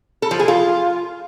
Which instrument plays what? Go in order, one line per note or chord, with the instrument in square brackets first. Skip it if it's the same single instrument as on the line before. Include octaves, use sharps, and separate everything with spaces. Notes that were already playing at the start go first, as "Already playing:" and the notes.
[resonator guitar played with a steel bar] A4
F3
G#4
F4